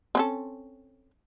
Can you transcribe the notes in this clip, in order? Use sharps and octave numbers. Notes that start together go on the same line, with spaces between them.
C4 C#4 A4